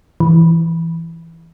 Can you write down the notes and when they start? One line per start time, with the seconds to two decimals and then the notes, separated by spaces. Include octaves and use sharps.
0.20 E3